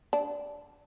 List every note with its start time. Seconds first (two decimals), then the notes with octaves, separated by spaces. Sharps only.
0.13 D4